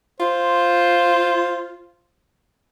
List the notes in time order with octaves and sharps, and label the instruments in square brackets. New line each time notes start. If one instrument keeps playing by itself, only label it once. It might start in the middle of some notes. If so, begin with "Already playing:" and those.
[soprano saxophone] F4 [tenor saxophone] C5